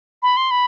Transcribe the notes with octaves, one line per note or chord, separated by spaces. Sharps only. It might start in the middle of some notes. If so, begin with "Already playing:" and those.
B5
C6
B5